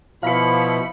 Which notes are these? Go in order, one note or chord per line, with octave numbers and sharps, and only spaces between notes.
B2 F3 E4 F5 B5 C#7